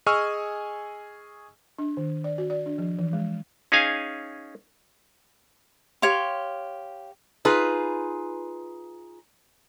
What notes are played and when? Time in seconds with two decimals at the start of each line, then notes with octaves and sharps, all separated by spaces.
0.06 G#4 D#5 G#5 C#6 E6 F6
1.79 D4
1.97 D#3
2.24 D5
2.38 F#4
2.50 D5
2.66 D4
2.78 F3
2.99 E3
3.13 G#3
3.72 C#4 D#4 G#4 F5 G#5
6.02 G4 C#5 F5 C6
7.45 D#4 F4 G#4 B4